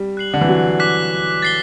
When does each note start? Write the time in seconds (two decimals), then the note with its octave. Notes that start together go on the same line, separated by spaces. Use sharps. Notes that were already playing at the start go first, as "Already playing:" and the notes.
Already playing: G3
0.17 F#6 C7 F#7
0.34 D3
0.41 E3
0.49 F#3
0.80 D6 F#6 B6 F#7
1.42 A6 C7 G7